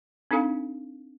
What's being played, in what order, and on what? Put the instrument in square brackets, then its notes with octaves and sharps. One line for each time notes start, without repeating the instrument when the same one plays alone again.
[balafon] C4 D4 D#4 A4 F5 G#5